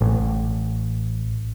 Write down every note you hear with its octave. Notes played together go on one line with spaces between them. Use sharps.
A1